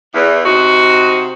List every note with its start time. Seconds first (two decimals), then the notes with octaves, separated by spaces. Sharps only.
0.14 E2
0.44 C3 D#4 F#4